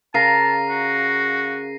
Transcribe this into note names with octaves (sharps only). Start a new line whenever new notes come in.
C#3 A#4 F5 A5 A#6 C7 D#7
F#4